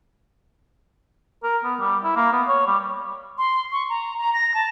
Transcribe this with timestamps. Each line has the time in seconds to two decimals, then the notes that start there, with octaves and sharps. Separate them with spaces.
1.43 A#4
1.64 B3
1.79 G3
2.04 E4
2.16 A#3
2.32 B3
2.48 C#5
2.67 G3
3.38 C6
3.72 C#6
3.89 A#5
4.19 A#5
4.34 A#6
4.54 A5